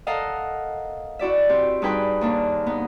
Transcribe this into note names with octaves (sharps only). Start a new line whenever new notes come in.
A4 A#4 D#5 F5 F#5
E4 F#4 D5 E5
C4 G4
G2 D#4 G#4 B4 G5 B5
D#2 A#3 D4
B3 D#4